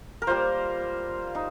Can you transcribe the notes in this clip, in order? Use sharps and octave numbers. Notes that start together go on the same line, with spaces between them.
A#4
G3 A#3 F4 C5
D#4